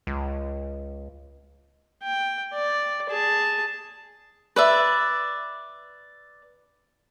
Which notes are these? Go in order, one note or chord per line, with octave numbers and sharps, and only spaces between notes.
C#2
G5
D5
G#4 A5
B4 D5 E5